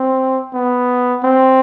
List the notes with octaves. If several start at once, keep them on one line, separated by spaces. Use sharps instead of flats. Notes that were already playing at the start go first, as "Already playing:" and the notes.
Already playing: C4
B3
C4